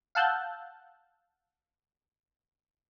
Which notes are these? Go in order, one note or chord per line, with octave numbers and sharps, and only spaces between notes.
F5 F#5 A5 E6 F#6 G6